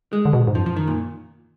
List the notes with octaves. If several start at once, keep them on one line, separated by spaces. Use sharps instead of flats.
G#3
D3
B2
A#2
G#2
F#2 F3
F3
D#3
A#2